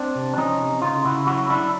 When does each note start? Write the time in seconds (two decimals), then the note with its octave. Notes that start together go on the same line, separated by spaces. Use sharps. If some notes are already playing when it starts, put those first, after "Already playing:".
Already playing: C4 D4
0.15 C3
0.34 D4
0.37 F3 C#4 D#4
0.60 C3
0.82 C#3 D#4 F4
1.04 C#3 E4 F#4
1.27 F#3 E4 F#4
1.49 F#3 D4 E4